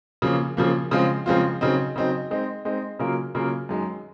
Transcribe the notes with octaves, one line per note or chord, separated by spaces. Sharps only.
C#3 F3 A#3
C#3 F3 A#3
C#3 F3 G#3 C4 F4
C#3 F3 G#3 C4 F4
C#3 F#3 C4 D#4
C#3 F#3 C4 D#4
G#3 C4 D#4
G#3 C4 D#4
C#3 F#3 A#3 F4 A#4
C#3 F#3 A#3 F4 A#4
F#2 D#3 G#3